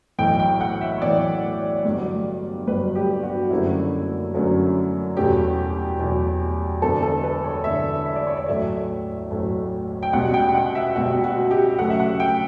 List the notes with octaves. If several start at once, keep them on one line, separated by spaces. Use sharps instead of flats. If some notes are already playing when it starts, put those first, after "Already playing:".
B1 A2 E3 G5
G5
F#5
E5
C#5
B1 A2 E3 D5
G1 G2 F#3
G1 G2 F#3 B4
G4
F#4
F#1 F#2 D3 F#3 A3 E4
F#1 F#2 D3 F#3 A3
E2 B2 F#3 A3 G4
E2 B2 F#3 A3
E1 E2 D3 A4
A4
B4
C#5
E1 E2 D3 E5
E5
D5
C#5
D5
A1 A2 F#3 A3 E5
A1 A2 F#3 A3
G5
C#2 B2 G3 F#5
G5
G5
F#5
E5
C#2 B2 G3 F#4
F#4
G4
D2 C#3 F#3 A3 F#5
E5
F#5
G5